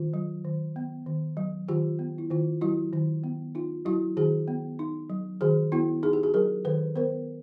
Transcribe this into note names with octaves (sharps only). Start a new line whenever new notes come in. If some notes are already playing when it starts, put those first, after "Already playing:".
Already playing: D#3 F4
F#3
D#3
B3
D#3
F#3
D#3 F4 G4
B3
E4
D#3 F4
F#3 E4 F#4
D#3
B3
D#4 F4
F#3 E4 F#4
D#3 F#4 G#4
B3
D#4
F#3
D#3 F#4 G#4
B3 E4 F#4
D#4 G#4
G4
F#4 G#4
F#3 G#4 A#4
D#3 A4 B4
B3 A#4 C5